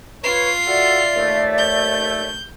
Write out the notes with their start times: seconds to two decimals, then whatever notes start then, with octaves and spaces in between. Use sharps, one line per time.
0.24 F4 B4 C#5 C7
0.67 F#4 A4 D5 E5
1.16 D#2 A3
1.59 G6